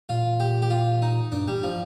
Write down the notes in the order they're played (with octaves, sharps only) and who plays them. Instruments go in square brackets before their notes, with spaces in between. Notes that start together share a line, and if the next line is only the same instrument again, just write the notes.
[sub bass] A#2 [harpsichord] F4
[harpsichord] G4
G4
F4
D#4
[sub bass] G2 [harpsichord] D4
[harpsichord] G3
F3